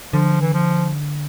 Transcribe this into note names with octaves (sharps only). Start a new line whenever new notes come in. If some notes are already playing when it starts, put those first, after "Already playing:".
D3 F3
E3
F3